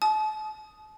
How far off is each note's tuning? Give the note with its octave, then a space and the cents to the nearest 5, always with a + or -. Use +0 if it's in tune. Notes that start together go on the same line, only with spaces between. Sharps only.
A5 -40 D#6 +5